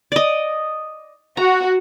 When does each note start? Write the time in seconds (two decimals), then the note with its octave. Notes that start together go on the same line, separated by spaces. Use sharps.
0.12 D5 D#5
1.37 F#4 A#5